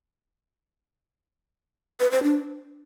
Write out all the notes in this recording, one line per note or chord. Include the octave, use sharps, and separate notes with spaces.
B4
C5
D4